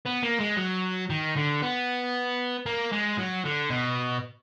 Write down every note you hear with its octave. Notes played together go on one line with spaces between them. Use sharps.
B3
A#3
G#3
F#3
D#3
D3
B3
A#3
G#3
F#3
D3
B2